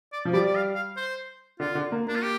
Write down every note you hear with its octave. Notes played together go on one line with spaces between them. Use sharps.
D5
F3
G3 D5
D5
F5
F5
C5
D3 F4
D3
A#3
A#3 D4
F4
G4